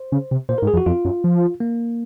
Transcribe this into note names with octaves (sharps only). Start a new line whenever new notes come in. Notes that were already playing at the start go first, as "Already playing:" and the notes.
Already playing: C5
C#3
C3
A#2 C5
A#4
G#2
G#4
F2
F#4
F2 F4
F#2
F3
A#3